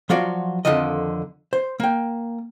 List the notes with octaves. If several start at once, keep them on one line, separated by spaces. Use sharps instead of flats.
F3 F#3 F4 F#4 D5
F2 G#2 D3 D#3 F3 D#5
C5
A#3 G5